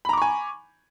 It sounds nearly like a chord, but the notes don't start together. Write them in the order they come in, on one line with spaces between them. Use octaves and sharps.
B5 A#5 D6 C#6 G#5